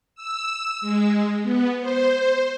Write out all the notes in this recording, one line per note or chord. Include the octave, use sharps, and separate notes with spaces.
E6
G#3
B3
C5